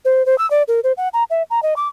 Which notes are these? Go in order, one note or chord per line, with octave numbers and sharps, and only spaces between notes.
C5
C5
E6
D5
A#4
C5
F#5
A#5
E5
A#5
D#5
D6